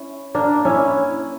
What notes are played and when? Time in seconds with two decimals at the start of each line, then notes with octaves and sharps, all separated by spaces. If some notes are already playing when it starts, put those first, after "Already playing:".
Already playing: C#4 E4
0.35 A#3 D4
0.65 C#4 E4